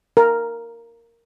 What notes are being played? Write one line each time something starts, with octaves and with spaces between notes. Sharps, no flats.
A#4